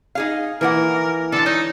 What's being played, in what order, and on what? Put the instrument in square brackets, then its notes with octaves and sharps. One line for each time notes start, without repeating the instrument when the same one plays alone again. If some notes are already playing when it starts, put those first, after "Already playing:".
[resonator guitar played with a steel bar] D#4 G#4 F5
[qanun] E3 [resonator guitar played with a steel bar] F3 A#3 F#5 [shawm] A#4
[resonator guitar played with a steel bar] D3 G#3 [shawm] A4
[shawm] D#4 [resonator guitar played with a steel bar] C#5